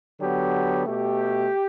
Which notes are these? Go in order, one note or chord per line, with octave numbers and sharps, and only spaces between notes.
D3 F#3 B3 G4
B2 A3 G4